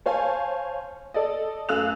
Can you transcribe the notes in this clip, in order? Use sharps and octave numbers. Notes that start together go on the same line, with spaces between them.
C5 C#5 F5 G#5 A5
A4 D5 D#5
F#2 A3 F5 E6 F#6 F7